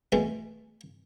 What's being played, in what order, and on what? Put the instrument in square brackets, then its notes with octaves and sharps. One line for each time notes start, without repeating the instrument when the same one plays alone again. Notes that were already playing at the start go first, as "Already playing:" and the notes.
[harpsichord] B2 E3 G#3 A3